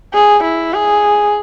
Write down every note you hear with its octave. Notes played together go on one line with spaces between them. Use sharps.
G#4
E4
G#4